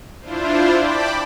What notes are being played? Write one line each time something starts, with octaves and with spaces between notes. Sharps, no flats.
D4 E4 F4 C5
D5 G5 A5 B5 D6